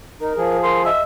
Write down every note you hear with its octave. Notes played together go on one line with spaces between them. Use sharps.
D#4 A#4
F3 G#4
A#4 C6
D#5 E5